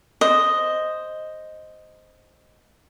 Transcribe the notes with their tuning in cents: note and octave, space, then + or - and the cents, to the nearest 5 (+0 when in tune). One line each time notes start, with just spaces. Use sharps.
C5 +0 D#5 +0